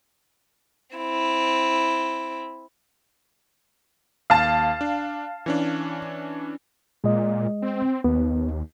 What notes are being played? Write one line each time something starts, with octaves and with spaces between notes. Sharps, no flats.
C4 E4
D#2 F5 A5
D4
E3 C#4 D4
A#2 G#3 D#5
C4
D#2 B3